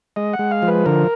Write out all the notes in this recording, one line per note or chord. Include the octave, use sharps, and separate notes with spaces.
G#3 D#5
F#5
G#3
F5
F3
B4
D3 A#4